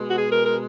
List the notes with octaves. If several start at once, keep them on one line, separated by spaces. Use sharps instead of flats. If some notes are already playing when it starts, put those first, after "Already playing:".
Already playing: B2 G#3
F#4
G#4
A#4
A#4